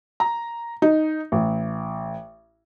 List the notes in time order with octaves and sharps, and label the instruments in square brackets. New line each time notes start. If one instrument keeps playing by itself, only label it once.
[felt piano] A#5
D#4
A1